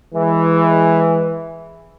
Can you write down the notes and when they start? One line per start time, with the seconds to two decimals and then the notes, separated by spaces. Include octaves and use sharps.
0.15 E3 G#3